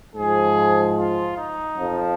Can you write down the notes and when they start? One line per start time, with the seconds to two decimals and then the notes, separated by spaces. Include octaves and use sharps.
0.15 G#2 F3 G#4
0.96 F4
1.35 D#4
1.75 F2 F3